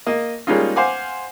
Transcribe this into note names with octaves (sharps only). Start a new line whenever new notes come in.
A#3 D#5
G3 G#3 A#3 C#4 D#4 F4
C5 F5 F#5 G#5 D6